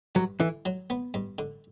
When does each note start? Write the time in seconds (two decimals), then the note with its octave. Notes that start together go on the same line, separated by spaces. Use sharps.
0.15 G2 F#3
0.40 D3 E3
0.65 F#3
0.90 B3
1.14 G2
1.38 D3